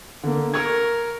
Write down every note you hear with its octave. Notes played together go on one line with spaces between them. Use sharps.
D3 A#3
A#4 C#6 G#6